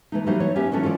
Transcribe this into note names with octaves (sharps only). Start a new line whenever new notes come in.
E3 A3 D#4
E3 F#3 G3 A#3 D#4 C5
C#5
B3 C#4 D#4 G4 E5
D#3 E3 F#3 C#4 D4 A4
C#4 F4 A4 C#5 D5